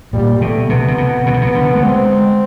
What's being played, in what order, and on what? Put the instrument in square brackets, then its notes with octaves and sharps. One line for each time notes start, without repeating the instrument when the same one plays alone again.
[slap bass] A#2 [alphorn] G3
[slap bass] B2 [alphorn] A3
[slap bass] C3 [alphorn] B3
[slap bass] C3
B2
[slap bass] C3 [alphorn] B3
[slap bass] B2
C3
D3
A3
[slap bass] G#3 [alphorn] C4